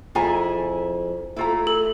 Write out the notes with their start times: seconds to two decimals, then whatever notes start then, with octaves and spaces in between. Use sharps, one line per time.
0.15 F2 E4 F4 G#4 G#5 A#5
1.37 A3 E4 F4 A#5
1.67 A4